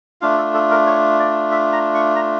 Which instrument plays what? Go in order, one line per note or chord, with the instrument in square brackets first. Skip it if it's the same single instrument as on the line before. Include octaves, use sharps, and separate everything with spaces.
[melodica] A3 D4 F4 F5
A4
A4
A#4
C#5
D5
E5
A#5
C#6
A#5